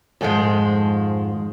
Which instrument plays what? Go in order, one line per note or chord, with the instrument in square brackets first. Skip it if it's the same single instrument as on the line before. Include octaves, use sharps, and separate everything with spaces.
[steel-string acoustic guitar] F2 G#2 D#3 F3 G#3